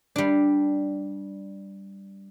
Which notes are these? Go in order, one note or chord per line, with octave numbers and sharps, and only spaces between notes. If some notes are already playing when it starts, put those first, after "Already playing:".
G3 D4